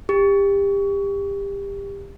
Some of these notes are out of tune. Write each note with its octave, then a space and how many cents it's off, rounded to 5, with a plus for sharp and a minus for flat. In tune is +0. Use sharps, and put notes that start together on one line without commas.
G4 +25